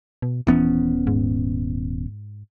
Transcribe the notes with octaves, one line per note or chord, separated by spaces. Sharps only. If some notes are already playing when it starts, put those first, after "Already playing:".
B2
D#1 E3 B3 C#4
G#2